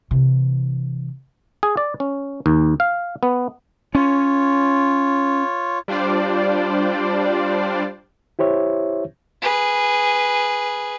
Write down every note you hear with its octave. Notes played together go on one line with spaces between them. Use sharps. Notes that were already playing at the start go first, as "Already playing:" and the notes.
C3 E3
G#4
D5
C#4
D#2
F5
B3
C#4 F4 C#5
G3 D4 F4 C5 D5
E4 G4 C5 C#5 E5
G#4 B4